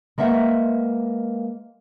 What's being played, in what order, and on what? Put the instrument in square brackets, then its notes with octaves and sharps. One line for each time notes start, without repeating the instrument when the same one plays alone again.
[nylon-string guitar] G#3 A#3 B3 E5 F#5